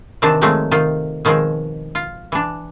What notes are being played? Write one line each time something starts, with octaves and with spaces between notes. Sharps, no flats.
C3 D#3 E3 C4 D4 A5
D#3 F3 F#3 G#3 A3 C4
C3 D#3 F4 G5
B2 D#3 F3 G#3 C4
F4
E3 D4